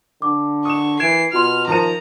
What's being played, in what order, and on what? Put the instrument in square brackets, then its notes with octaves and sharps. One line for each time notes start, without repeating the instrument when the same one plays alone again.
[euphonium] D3 [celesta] D6
[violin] C#6 [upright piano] D#6 E7
[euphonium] E3 [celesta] G#6 D7 [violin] C7 [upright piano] E7
[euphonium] B2 [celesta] F4 C6 [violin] F6
[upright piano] D#3 F3 D#7 [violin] A#5